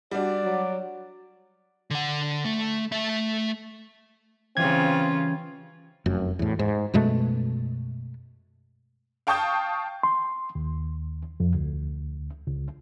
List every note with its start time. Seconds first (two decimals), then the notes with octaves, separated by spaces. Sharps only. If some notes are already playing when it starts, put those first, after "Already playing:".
0.11 G3 D4 F#4 D5 F#5
0.43 F#3
1.91 D3 F#5
2.45 A3
2.92 A3 E5
4.57 C#3 E3 G3 C4 C#4 F4 G#6
6.06 F1 F#2
6.39 E2 A2
6.59 G#2
6.94 F#2 B2 G#3 A3
9.27 F5 G5 A5 C#6 D#6 G6
10.03 C6
10.55 D#2
11.40 F2
11.55 D2
12.47 C#2